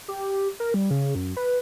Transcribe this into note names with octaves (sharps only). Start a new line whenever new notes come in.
G4
A#4
G3
C#3
F#2
B4